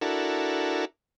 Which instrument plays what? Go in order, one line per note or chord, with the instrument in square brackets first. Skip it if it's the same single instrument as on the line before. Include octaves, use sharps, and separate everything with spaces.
[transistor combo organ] D4 E4 F#4 A4 A#4